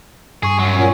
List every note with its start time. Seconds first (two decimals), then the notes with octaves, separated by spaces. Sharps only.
0.43 G2 G#4 C#6
0.59 F#2 F#3
0.76 A#2 C#4